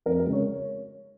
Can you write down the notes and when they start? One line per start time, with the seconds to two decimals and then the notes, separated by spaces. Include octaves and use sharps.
0.06 F2 A#4
0.20 A#4
0.27 C#3 G#3
0.33 C#5